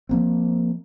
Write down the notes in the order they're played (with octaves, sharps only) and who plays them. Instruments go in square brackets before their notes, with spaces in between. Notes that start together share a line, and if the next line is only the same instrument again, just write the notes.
[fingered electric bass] F3 A#3 C4